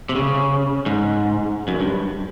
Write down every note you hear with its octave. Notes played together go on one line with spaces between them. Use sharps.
C3
C#3
G#2
F#2
G2